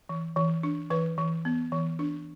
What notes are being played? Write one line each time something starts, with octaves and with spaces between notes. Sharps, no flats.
E3
E3
D4
E3 B4
E3
B3
E3
D4